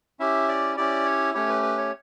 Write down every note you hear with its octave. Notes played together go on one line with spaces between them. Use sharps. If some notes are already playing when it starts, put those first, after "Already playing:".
C#4 E4 G4 E5
D5
C#4 E4 G4 D5
C#5
A3 C#4 G4 C#5
B4
B4
C#5